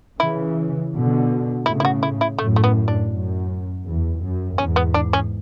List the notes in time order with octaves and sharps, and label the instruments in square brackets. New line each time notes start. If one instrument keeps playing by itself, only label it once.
[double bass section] C#3 E3 [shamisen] E4
[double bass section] B2 D3
[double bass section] A2 C#3 [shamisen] E4
[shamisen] E4
F#4
E4
E4
[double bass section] F#2 A2 [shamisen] A3
[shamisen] A3
B3
D4
[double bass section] F#2
E2
F#2
[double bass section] E2 G#2 [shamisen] C#4
[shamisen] B3
D4
C#4